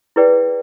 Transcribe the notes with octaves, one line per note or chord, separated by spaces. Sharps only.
E4 G#4 B4 D5 G5